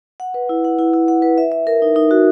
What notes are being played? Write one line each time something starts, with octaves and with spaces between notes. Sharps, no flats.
F#5
B4
E4
F#5
E4
E4
F#5
B4
E5
E5
A#4
D#4
D#4
F#4